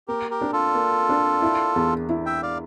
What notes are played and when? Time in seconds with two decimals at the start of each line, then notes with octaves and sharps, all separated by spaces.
0.08 A#3 G4 A#4
0.31 G4 A#4
0.41 D4
0.53 F4 A4
0.75 A#3
1.09 D4
1.42 E4
1.76 E2
2.09 E4
2.26 E5 G5
2.43 D5 F5